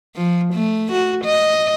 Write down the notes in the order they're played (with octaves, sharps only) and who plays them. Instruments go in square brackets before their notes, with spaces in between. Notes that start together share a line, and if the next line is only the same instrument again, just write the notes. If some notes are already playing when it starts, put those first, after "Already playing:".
[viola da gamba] F3
A3
F#4
D#5